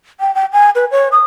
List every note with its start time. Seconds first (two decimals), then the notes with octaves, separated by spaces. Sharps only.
0.20 G5
0.35 G5
0.53 G#5
0.75 B4
0.91 C#5
1.12 D#6